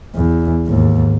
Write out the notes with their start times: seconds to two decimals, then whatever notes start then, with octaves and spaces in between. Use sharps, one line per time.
0.15 E2
0.67 D#2 G#2